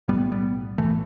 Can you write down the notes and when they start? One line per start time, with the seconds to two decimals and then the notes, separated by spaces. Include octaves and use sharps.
0.08 B1 A2 G3 B3
0.32 G3 B3
0.78 B1 A2 E3 A3